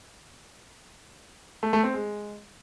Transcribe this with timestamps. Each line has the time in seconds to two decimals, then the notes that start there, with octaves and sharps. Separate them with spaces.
1.63 A3
1.73 A3
1.83 C4
1.94 G#3